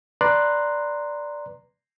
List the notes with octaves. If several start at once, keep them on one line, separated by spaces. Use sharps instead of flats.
B4 D5 A#5 C6 F#6